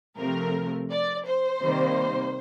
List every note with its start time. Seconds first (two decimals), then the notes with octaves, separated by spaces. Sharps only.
0.17 C3 F3 A3 A#4
0.91 D5
1.26 C5
1.63 C3 D#3 G3 A#3